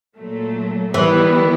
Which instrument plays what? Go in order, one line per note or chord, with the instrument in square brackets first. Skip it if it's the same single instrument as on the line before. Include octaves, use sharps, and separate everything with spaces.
[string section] A#2 F#3 A3
[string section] D#3 G3 B3 E4 [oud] E3